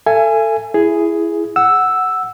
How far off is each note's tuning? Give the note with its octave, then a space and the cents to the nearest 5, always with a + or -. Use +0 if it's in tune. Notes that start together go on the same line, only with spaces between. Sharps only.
A4 +20 E5 +40 G#5 +0
E4 +15 G#4 +0
F#5 +0 E6 +0